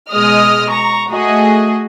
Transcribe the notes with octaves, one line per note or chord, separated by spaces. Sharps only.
B2 G#3 D#5 D#6 F6
A#5 C#6
A3 F#4 G#4 D#5